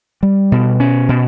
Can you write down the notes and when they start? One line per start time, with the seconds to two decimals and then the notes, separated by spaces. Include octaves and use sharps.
0.23 G3
0.52 B2
0.80 C#4
1.09 B2